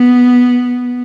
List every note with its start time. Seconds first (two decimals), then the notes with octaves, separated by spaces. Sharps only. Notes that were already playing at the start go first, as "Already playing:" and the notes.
Already playing: B3